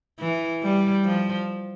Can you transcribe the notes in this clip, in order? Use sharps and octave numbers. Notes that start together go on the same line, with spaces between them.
E3
G3
F3